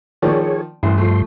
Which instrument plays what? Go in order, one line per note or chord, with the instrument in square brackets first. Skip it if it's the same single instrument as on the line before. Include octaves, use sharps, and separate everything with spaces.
[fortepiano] D#3 F3 D5 [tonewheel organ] G#4 C#5
[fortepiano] A1 [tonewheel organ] G2 C6
[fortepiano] F3 A3